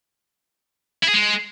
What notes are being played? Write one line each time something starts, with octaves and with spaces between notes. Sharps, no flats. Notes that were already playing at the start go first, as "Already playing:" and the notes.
E4
G#4
G#3